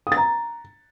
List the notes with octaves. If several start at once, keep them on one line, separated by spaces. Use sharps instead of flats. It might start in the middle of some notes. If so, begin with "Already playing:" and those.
D#6
A6
A#5